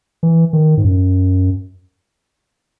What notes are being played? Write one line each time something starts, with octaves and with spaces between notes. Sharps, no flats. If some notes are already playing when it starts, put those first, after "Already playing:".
E3
D#3
G#2
F#2